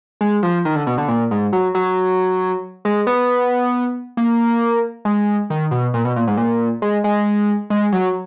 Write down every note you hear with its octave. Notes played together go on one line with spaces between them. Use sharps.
G#3
F3
D#3
D3
B2
D3
A#2
G#2
F#3
F#3
G#3
B3
A#3
G#3
D#3
B2
A#2
B2
A#2
G#2
A#2
G#3
G#3
G#3
F#3